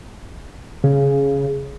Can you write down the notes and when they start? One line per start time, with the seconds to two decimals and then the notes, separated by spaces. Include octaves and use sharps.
0.84 C#3